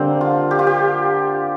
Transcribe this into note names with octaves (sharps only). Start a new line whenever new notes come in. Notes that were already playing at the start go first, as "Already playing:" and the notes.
Already playing: D3 G3 A#3 C4 D4
F4
G4
F4
G4